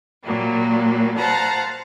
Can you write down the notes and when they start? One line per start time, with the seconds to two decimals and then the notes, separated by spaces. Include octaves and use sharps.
0.25 A#2 F#3 G3 A#3
1.19 C5 F5 F#5 A5 A#5